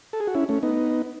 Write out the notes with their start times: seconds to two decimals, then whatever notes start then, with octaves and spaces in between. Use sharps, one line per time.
0.13 A4
0.20 G#4
0.27 F#4
0.35 C#4 E4
0.49 A3 C#4
0.63 B3 D#4